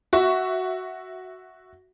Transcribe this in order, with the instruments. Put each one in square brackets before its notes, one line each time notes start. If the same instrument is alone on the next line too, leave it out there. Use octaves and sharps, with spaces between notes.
[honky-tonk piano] F#4 E5